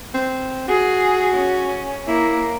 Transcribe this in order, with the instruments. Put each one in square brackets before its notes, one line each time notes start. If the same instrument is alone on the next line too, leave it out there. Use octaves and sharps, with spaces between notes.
[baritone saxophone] C4
[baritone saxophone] F#4 [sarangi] G#4
[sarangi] C#4
[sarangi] A#3 [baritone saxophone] E4